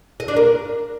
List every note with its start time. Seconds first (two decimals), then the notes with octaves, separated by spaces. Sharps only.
0.20 D#5
0.28 D4
0.36 A#4